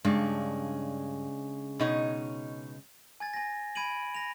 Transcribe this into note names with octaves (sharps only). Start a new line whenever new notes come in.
G2 C#3 G#3 D4
B2 D#4 C#5
G#5 G#6 A6
G#5 A#6
B5 G#6 D7 D#7 F#7
A#6 F7